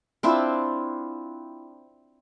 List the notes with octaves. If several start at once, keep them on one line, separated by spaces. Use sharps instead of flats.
C4 D4 E4 F4